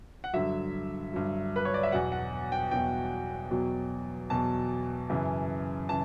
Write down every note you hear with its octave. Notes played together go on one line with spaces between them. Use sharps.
F#5
G2 D3 F#3 E5
G2 D3 F#3
B4
C#5
D5
E5
E2 B2 F#3 F#5
F#5
G5
E2 B2 F#3 G5
E2 B2 F#3
E2 B2 F#3 A5
F#2 C#3 E3
C#3 E3 A5